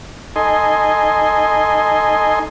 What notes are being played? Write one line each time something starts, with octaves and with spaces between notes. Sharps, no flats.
D#4 A4 D#5 G#5 C6